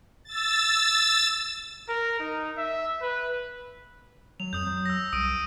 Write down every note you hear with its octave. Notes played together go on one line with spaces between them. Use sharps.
E6 A6
A#4
D#4
E5
B4
F#3 F7
F2 D#6 G6
F#3
E6 A#6
C2 D#6 D7 D#7